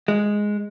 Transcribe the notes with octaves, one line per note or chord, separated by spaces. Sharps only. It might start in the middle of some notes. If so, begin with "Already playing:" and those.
G#3